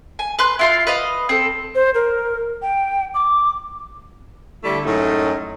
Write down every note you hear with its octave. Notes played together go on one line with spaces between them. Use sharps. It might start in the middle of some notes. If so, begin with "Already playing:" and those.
G#5
B4 C6 F#6
E4 F4 C6
B4 D#5 F5
C4 A4
C5
A#4
G5
D6
D3 G3 A3 E4
F#2 A2 G#3 A3 D#4